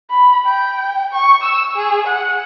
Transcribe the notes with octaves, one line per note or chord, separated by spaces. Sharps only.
B5
G5
C#6
E6
G#4
F#5